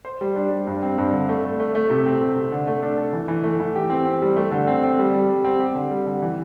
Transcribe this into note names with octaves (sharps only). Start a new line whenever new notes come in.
C5
G3
D4
G3
G2
C4
G2
D3
A3
A3
A3
A3
C3
C4
C3
C3
D3
A3
D4
A4
E3
E3
A3
E3
G4
C4
C4
G3
A3
D3
C4
C4
G3
G3
G3
C4
G4
D3
G3
D3
E3